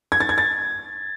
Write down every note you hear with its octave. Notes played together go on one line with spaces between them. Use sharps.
G#6
A6
G#6
A6